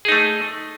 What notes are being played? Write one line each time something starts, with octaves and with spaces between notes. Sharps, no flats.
A3 D#4 G#4